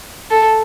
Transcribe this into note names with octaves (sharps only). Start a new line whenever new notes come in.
A4